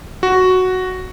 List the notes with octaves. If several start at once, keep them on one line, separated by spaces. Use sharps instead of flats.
F#4